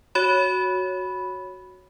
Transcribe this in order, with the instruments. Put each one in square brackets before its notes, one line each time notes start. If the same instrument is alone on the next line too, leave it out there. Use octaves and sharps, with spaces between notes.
[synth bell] F#4 C#5 B5